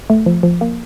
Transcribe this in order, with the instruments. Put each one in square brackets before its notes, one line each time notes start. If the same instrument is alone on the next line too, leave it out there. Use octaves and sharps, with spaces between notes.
[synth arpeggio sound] A3
F3
F3
A#3